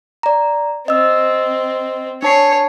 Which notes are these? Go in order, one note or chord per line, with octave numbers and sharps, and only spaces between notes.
D5 A#5
C4 D#5 E6
D4 C#5 A5 C7